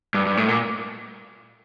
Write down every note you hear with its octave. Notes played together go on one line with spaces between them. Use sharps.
G2
G2
A2
A#2